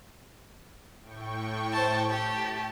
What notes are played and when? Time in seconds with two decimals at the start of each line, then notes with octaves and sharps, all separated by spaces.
1.01 A2 G5 C#6
1.72 C5 A5
2.09 G4 A5